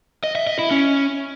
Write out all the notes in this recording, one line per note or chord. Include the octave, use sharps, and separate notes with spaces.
D#5
E5
D#5
E4
C#4